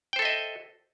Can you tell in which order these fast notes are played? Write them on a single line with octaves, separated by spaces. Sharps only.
G5 C5 A4 E5 D#5